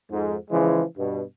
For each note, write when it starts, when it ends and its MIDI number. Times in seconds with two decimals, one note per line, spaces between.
0.10 0.36 41
0.10 0.36 44
0.51 0.83 49
0.51 0.83 52
0.51 0.83 53
0.51 0.83 56
0.98 1.22 43
0.98 1.22 47